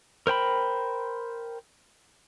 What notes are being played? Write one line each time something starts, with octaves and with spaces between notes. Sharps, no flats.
A#4 C5 G5 B5